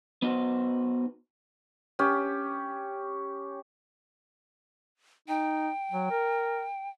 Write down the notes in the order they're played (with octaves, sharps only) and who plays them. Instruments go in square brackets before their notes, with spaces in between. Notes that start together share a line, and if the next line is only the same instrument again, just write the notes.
[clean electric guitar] B3 D#4 F#4 C5
[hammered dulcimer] C#4 G4
[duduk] D#4 [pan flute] G5
[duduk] F#3
A#4